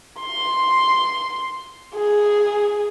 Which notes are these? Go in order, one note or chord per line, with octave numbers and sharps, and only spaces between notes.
C6
G#4